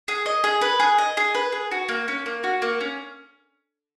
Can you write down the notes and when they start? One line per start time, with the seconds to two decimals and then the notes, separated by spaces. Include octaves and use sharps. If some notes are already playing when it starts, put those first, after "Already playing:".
0.08 G#4
0.26 D#5
0.44 G#4
0.61 B4
0.80 G#4
0.98 D#5
1.17 G#4
1.34 B4
1.52 G#4
1.71 F#4
1.89 A#3
2.08 C#4
2.26 A#3
2.44 F#4
2.62 A#3
2.81 C#4